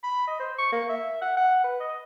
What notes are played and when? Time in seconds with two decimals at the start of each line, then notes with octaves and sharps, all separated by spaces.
0.04 B5
0.28 D#5
0.40 C5
0.58 C#6
0.72 A#3
0.89 E5
1.22 F#5
1.37 F#5
1.64 B4
1.80 D#5